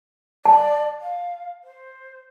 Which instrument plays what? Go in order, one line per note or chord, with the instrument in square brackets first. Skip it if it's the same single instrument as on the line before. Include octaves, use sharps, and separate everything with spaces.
[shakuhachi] D5 [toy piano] A5
[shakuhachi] F5
C5